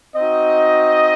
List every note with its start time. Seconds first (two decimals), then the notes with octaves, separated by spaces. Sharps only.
0.16 C4 D#4 F#4 D#5